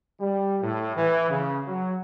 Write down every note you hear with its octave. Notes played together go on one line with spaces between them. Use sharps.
G3
A2
E3
C#3
F#3